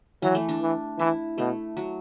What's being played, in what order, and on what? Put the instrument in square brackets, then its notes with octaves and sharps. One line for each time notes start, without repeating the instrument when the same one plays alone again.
[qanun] E3 [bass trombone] F#3
[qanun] A3
D4
[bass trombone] E3
[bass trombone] E3 [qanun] E4
[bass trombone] B2 [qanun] A3
[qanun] F#3